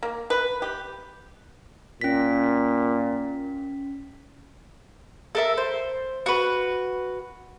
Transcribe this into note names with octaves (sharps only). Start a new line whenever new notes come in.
A#3
B4
G4
A#2 C#4 B6
A4 A#4 E5
C5
F#4 B4